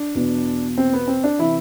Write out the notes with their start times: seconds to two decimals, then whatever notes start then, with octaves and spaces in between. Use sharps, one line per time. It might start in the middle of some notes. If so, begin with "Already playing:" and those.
Already playing: D4
0.15 E2 B2
0.78 C4
0.93 B3
1.08 C4
1.24 D4
1.39 C3 E3 E4